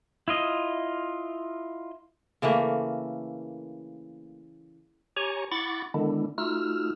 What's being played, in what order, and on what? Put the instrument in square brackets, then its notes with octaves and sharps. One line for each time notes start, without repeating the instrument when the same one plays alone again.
[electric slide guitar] E4 F4 D#5
[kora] C#3 E3 A3 A#3
[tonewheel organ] G4 C#5 G#5 A#5 C#6
E4 F#5 B5 C#6 D6 A6
D3 D#3 G#3 B3 D4 E4
A3 D#4 F4 F#4 E6 F6